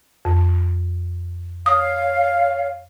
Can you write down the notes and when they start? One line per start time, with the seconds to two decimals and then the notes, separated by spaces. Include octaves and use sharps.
0.25 F2
1.66 C#5 F5 D#6